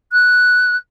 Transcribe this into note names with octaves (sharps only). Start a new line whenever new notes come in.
F#6